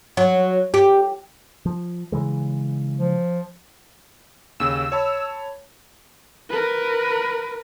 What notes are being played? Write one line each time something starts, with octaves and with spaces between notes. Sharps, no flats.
F#3
G4
F3
C#3 E3 G#3
F3
D#2 C#3 E6
C#5 A5 B5
A#4 B4